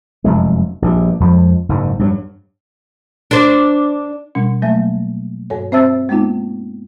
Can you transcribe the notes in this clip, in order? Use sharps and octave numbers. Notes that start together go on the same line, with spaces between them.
F1 F#2 G#3
A#1 G2
F2 F3 G#3
F#1 G#2
G2 F3 F#3
D4 C5
B2 G3 C#4
F#3 A3 A#3 E5
G2 A4 C#5
C4 C5 E5 A5 E6 A6
G#3 A#3 B3 D#4 F4